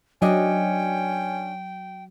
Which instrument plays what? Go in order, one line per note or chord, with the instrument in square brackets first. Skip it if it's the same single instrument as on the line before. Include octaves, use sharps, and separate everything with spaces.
[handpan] F#3 [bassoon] C#4 [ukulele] D4 D#5 [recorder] G5